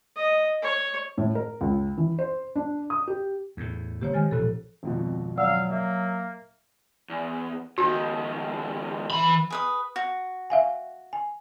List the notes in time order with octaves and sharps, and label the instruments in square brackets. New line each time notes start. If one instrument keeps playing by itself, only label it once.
[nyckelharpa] D#5
C#5
[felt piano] A2
A#4
C#2
E3
C5
D4
D#6
G4
[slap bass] E2 A2
[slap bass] F#1 A#3 [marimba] G4 C5 C#5
[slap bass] D#3 G#3 [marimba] G#5 F6 A6
[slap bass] E1 A#1 F3 [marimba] A4 F#6
[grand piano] G#1 F2 B2
[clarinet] F#3 [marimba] D5 F#5 E6 [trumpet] F5
[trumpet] A#3 [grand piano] E5
[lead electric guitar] E2
[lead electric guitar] C#2 D#3 [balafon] F#4
[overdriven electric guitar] E3 B5
[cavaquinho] G#4 B4 D#6
F#4
[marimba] E5 F5 G#5
G#5